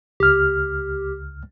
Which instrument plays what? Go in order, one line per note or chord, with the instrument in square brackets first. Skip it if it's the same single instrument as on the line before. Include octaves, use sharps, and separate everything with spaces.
[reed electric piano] C#2 F6 [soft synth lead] G4